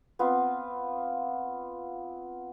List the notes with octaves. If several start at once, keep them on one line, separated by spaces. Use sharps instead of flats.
B3 C4 F4